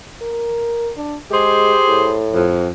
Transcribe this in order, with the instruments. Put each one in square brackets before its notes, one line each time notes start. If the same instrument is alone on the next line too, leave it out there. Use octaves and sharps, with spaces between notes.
[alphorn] A#4
D4
[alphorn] G#3 [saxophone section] G4 G#4 C5
[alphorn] A2
[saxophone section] F2